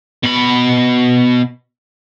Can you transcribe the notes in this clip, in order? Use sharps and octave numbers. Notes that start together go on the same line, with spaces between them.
B2 B5